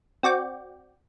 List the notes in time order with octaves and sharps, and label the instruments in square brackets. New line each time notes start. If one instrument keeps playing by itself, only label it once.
[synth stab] C4 F#4 D5 G5